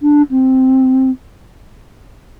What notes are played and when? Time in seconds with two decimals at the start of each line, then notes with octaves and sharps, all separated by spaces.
0.02 D4
0.31 C4